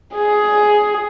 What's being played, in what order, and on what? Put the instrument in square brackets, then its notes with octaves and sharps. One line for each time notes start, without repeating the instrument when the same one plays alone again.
[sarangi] G#4